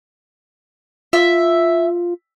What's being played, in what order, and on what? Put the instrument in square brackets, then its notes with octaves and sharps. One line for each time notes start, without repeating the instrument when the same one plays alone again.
[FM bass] F4 [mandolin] E5